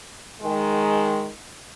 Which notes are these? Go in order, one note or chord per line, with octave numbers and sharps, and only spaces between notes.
D#3 G#3